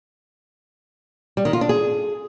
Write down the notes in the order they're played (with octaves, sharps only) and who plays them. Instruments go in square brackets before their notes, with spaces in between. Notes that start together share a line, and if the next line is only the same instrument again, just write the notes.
[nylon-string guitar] G3
D#3
F4
D4
G#4